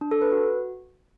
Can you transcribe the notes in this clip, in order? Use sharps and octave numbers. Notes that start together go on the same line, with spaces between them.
D4
A4
B4
F#4